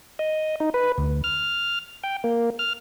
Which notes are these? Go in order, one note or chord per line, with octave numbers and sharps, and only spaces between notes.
D#5
D#4
B4
D2
F6
G5
A#3
F6